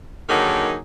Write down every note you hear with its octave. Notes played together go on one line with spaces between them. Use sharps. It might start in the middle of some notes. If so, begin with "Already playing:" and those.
D3 D#3 F#3 A#3 D#4 G#4